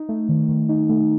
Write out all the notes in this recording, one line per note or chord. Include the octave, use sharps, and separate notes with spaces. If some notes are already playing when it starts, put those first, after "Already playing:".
Already playing: D#4
A3
D#3
D#3
D#4
A3